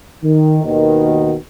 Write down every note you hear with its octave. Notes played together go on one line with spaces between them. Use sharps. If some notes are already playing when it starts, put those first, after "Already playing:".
D#3
D#2 B2 D#3